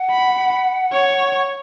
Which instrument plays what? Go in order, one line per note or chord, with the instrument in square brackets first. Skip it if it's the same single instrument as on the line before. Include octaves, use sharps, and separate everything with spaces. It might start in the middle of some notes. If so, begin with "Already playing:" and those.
Already playing: [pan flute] F#5
[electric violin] B5
C#5